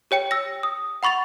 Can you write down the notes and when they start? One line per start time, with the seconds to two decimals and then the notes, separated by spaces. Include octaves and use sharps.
0.11 G4 C#5 G5 C#7
0.31 E6 A#6
0.63 D#6
1.03 F#5 B5 C#6 A6 F7